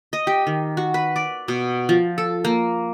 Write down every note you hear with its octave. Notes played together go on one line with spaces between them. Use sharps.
D#5
G4
D#3
F#4
B4
D5
B2
F3
A4
A#3